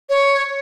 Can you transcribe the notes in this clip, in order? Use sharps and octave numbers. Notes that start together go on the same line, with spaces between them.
C#5